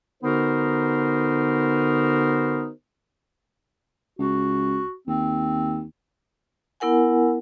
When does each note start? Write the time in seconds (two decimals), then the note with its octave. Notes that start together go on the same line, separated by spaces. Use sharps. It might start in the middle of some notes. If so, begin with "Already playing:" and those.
0.23 D3 B3 D#4 F#4 A#4 C5
4.19 C#2 F#4
5.07 D#2 C4
6.80 B3 E4 A#4 F#5 G#5